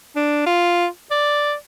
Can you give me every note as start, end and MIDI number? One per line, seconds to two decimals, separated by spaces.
0.16 0.43 62
0.46 0.87 65
1.11 1.54 74